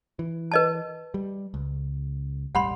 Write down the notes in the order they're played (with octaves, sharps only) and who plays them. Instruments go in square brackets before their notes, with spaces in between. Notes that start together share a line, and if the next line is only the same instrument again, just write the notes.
[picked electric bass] E3
[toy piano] B4 D#5 A5
[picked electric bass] G3
C#2
[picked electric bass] E1 A1 G3 [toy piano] F#5 B5 C6